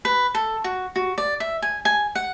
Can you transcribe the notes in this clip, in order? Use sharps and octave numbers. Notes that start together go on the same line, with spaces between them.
B4
A4
F#4
F#4
D5
E5
G#5
G#5
F#5